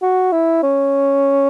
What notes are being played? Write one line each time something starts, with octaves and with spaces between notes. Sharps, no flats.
F#4
E4
C#4